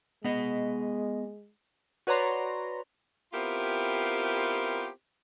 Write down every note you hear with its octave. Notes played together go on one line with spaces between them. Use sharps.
G#3 B3 D#5
F#4 B4 C#5 D5 A#5 C6
B3 C4 E4 F4 G4 A#4